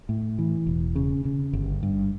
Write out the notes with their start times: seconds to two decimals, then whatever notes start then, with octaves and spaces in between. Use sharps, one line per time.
0.09 A2
0.39 E3
0.67 E1
0.96 C#3
1.25 C#3
1.53 G1
1.83 G2